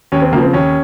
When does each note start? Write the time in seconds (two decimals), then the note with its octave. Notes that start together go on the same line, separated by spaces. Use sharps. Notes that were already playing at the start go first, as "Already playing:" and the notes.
0.12 D#2 C#4
0.22 C4
0.32 C#3 A#3
0.36 F3
0.43 C4
0.53 D#2 C#4